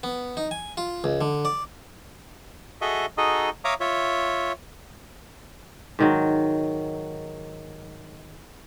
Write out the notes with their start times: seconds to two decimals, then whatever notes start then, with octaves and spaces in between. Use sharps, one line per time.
0.03 B3
0.37 D#4
0.51 G#5
0.77 F4
1.04 C#2
1.21 D3
1.45 D5
2.81 F#4 G#4 A4 D#5 E5
3.18 D#4 F#4 G#4 A4 D#5
3.65 C#5 E5 F5 A#5 D6 D#6
3.80 F4 C#5 E5
5.99 G#2 D#3 F#3